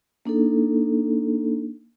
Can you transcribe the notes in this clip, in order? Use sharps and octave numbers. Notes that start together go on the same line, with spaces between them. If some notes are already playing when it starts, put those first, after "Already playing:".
A#3 D4 D#4 A4